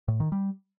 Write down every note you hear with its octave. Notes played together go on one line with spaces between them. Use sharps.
A2
D#3
G3